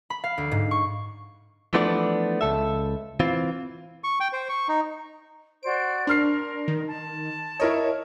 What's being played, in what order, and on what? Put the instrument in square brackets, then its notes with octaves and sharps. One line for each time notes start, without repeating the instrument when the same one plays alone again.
[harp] B5
F5
D2
G#2
C#6
[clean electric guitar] E3 F3 A3 B3 D4 D5
C#2 A4 E5
E3 C4 F4
[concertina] C#6
G5
C5
C#6
D#4
[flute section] F#4 C5 D5 [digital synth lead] D7
[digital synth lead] D4 [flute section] A#4 [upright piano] C6 F6 C7
[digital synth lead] D#3
[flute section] A5
[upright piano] E4 A#4 D#5 [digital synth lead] C#5